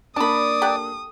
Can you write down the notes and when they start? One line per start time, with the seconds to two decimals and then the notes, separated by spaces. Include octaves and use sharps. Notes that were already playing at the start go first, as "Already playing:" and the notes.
0.16 A#3 D4 D5 A5 B5 D#6
0.62 G4 A4 F#5